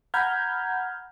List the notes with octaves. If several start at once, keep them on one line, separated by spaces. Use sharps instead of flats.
F#5 A#5 B5 F6 G6 G#6